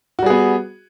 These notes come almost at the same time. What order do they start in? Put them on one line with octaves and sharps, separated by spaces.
F#4 G3 G#4 B3